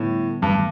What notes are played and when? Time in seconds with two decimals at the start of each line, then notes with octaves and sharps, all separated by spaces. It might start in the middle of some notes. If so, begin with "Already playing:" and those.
Already playing: A2 D3 G3 B3
0.42 G2
0.50 D#3 F#3 A3